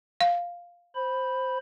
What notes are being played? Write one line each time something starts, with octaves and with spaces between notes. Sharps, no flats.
F5
C5 B5